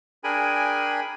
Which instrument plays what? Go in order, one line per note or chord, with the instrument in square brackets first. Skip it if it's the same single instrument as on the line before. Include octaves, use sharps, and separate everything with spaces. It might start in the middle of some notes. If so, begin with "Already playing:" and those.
[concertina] D4 G#4 A#4 G5 G#5 B5